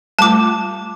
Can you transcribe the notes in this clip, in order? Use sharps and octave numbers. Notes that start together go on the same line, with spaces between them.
G3 A3 F4 A5 D6